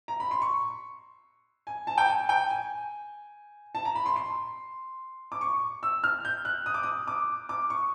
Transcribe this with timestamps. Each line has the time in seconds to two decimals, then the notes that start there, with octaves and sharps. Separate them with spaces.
0.08 A#5
0.20 B5
0.31 C6
0.42 C#6
1.67 G#5
1.87 A5
1.98 G5
2.08 G#5
2.29 G5
2.50 G#5
3.75 A5
3.85 A#5
3.95 B5
4.06 C6
4.16 C6
5.32 D6
5.41 C#6
5.83 E6
6.04 F6
6.25 G6
6.45 F#6
6.66 D#6
6.74 D6
6.83 D#6
7.08 D6
7.49 D6
7.70 C#6